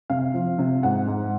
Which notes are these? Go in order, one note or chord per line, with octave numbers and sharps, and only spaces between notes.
C3 F5
F3
C3
G#2 F#5
G#2